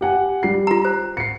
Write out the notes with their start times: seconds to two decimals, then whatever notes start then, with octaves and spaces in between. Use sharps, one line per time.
0.01 G4 F#5 G#5
0.43 G3 C7
0.67 F4 A#5
0.85 C5
1.17 C7 C#7